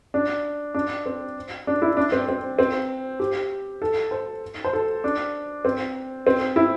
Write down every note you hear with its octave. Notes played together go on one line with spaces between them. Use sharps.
D4
D4
C4
D4
E4
D4
C4
C4
C4
G4
A4
C5
C5
A4
D4
C4
C4
E4